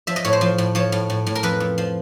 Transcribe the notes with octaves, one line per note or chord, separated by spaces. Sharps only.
F3 E5
D#5
A2 C#5
C5
F3
A2
F3 C#5
A2
A2
A2
A#4
F2 B4
F2
F3